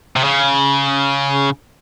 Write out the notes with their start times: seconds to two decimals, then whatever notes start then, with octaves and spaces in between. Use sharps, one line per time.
0.16 C3
0.24 C#3